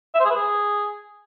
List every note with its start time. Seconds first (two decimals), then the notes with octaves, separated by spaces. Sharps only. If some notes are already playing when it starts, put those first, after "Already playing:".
0.15 E5
0.20 C5
0.25 G#4
0.30 B4
0.35 G#4